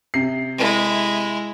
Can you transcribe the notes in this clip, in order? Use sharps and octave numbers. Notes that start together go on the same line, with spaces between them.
C3 C7
G#3 E4